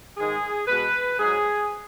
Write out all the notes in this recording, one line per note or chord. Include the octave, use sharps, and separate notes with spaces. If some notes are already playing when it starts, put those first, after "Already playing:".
G#2 D#3 G#3 G#4
B2 G#3 B4
G#2 F#3 G#4